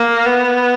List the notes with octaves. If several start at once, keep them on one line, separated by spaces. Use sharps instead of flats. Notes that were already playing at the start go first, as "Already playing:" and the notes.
Already playing: A#3
B3